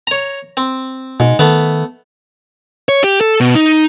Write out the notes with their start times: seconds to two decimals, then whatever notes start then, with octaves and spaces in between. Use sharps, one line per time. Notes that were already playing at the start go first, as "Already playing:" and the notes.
0.07 C#5 A#5
0.57 C4
1.20 G#2 B2
1.39 D#3 A3 B3
2.89 C#5
3.04 G4
3.21 A4
3.40 B2
3.55 D#4